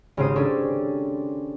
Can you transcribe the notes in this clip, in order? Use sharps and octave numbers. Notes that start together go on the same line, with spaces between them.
G#1 C#3 C4 G4 C5 D#6
C#4 D4 A4